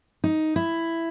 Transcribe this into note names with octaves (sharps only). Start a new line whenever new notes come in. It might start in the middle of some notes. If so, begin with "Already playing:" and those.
D#4
E4